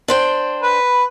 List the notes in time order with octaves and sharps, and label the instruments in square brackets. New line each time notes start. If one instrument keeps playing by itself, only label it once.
[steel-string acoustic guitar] D4 C5 G5
[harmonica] B4